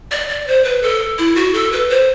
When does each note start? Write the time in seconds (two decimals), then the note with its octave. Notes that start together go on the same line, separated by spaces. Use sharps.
0.11 D5
0.29 D5
0.47 C5
0.64 B4
0.83 A4
1.18 E4
1.36 F#4
1.54 A4
1.72 B4
1.90 C5